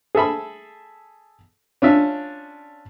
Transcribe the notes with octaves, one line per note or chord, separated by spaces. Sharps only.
G#4 A4 E5 B5
C#4 D4 F4 E5